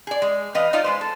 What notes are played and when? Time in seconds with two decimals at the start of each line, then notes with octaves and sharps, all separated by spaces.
0.07 G#4 D5
0.22 G#3
0.54 E3 B4 D#5 F5
0.73 D#4 F4 D5 D#5 F5
0.84 G#3 B4 C5
1.01 A4